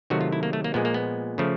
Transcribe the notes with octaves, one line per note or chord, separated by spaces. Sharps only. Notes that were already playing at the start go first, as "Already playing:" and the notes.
C3 D#3 F#3 A3 F#4
F4
E4
A#3
A3
A#3
A#2 F3 G#3 B3
A#3
B3
C#3 F3 A3